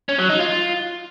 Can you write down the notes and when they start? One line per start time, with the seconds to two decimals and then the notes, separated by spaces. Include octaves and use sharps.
0.09 C#4
0.19 F#3
0.30 D#4
0.40 F4